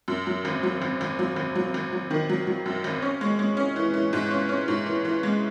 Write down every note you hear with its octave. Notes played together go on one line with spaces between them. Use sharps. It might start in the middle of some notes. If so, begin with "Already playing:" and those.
F#2
F#3
G#1
F#3
G#1
G#1
F#3
G#1
F#3
G#1
F#3
D#3
F#3
F#3
F#2
G#1
C#4
G#3
G#3
C#4
E3
E3
G#2
C#4
C#4
G#2
E3
E3
G#3